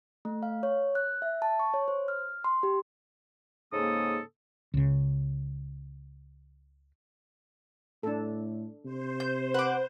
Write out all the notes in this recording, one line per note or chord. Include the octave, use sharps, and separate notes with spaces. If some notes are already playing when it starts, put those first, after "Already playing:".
A3
F5
C#5
F#6
E5
A5
C#6
C#5
C5
F6
C6
G4
G#2 C#3 A#3 A4 D#6
C#2 C#3
A2 D4 A4
C3 C5
G6
B4 F#5 D6